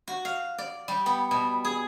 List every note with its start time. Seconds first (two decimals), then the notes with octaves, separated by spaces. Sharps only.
0.08 F#4
0.25 F5
0.58 D5
0.88 G3
1.06 B3
1.31 B2
1.65 G#4